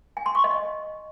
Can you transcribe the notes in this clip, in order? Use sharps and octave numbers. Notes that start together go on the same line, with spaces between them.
G#5
C6
C#6
D#5